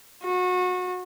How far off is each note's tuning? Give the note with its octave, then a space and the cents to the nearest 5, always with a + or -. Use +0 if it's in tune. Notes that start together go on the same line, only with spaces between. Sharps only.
F#4 -30